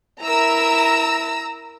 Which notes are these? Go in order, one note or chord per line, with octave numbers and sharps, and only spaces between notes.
E4 A#4 A#5 E6